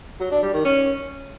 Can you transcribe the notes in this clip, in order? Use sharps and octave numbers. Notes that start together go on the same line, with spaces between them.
F#3
D4
G3
D#3
C#4